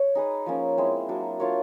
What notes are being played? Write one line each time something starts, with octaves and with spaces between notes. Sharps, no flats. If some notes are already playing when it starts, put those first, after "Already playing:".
Already playing: C#5
D#4 G#4 B4
F3 A#3 C#4
G#3 C4 E4
F#3 A#3 D4
D4 F4 A#4 C#5